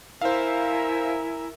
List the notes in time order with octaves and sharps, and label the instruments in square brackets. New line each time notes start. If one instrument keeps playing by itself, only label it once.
[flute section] E4 G#5 A#5 [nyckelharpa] A#4 E5 [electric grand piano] C5 F5